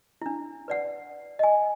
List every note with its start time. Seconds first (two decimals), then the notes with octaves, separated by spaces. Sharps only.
0.22 D4 E4
0.68 B4 D5 F#5
1.39 D#5 G#5